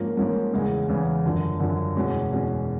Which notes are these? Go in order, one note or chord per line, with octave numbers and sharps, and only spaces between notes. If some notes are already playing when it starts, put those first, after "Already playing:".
Already playing: G#2 F3 A#3 C#4
G#2 F3 A#3 C#4
E2 C#3 E3 G#3
E2 C#3 E3 G#3
F#2 D3 F3
F#2 D3 F3
E2 B2 G#3 C#4
E2 B2 G#3 C#4